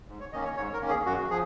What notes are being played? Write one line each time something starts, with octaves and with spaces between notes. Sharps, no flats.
G#2
C#5
D#3 A#3 C#4 D#5
C#5
G#2 C#5
A#4
D#3 A#3 C#4
G#4
F#2 F#4
F3 G#4